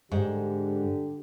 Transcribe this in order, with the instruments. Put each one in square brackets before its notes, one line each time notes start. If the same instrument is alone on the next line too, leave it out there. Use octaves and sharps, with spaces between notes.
[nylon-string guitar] G#2 [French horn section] D3 G4